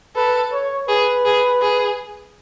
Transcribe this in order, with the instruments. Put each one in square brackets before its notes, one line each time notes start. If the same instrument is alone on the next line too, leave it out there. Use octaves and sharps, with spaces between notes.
[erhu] A4 [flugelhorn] B4
[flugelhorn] C#5
[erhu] G#4 [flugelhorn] B4
[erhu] G#4
G#4